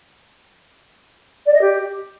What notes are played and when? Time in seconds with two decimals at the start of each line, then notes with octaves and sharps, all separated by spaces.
1.46 D5
1.54 D#5
1.61 G4